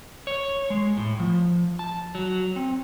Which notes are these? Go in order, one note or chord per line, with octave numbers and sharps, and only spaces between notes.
C#5
G#3
A2
F3
A5
F#3
C4